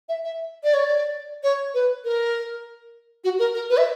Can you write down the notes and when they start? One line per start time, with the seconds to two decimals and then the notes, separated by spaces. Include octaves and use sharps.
0.09 E5
0.24 E5
0.63 D5
0.74 C#5
0.84 D5
1.43 C#5
1.74 B4
2.04 A#4
3.24 F#4
3.39 A#4
3.54 A#4
3.70 B4
3.77 E5